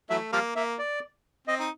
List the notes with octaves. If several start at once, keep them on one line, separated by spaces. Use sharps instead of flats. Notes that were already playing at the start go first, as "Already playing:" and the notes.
E3 F#3 A3 E5
F3 G3 A#3 F5
A#3 E5
D5
C4 D#5
D#4